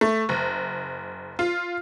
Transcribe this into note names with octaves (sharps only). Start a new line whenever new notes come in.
A3
F#1
F4